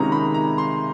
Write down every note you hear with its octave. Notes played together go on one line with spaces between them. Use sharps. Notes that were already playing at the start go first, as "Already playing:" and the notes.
Already playing: C#2 C3 D#3 G#3 C#4 A#5
B5
A#5
C6